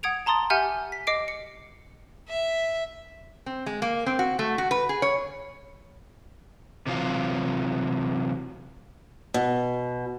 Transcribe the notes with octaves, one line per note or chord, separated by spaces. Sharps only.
F#5 D#6 G#6 D7 F7
A5 A#5 C6 D#6 A6
G4 E5 F#5 G#5 F6 G6
B6
D#5 D6 C7 D7
C#7
E5
C4
G#3
A#3
C4
F#4
A3
F#4
B4
G#4
C#5
C3 E3 F#3 F4
B2